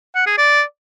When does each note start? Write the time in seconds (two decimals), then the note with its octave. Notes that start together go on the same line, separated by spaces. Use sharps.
0.15 F#5
0.26 G#4
0.37 D5